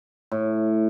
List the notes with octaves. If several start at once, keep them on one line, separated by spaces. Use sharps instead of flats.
A2